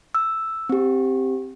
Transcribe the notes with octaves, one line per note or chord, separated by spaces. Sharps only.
E6
C4 G4